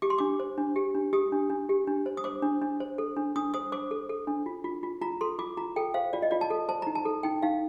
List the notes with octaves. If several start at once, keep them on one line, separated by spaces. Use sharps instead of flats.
G4 D6
C6
D4 D6
C5
D4
G4
D4
G4 D#6
D4
D4
G4
D4
C5
D#6
C5 D6
D4
D4
C5
A4
D4
D4 D#6
C5 D#6
C5 D6
A4
A4
D4
F4
F4
F4
F4 A#5
A4 C6
F4 D6
F4 A#5
A4 G5
C5 F5
F4 D5
D#5
F4 D5
A5
A4
C5 A5
D#4 A#5
A5
A4
D#4 G5
D#4 F5